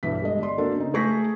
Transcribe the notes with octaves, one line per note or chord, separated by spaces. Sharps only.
B1 G2 E3 E5 B6
G3 G#3 A4 D#5
G1 D5 D#5 C6
A#3 C4 D4 F#4 A4 A#4
C#3 D#4
A3 G#4 C#6 G6 A#6 B6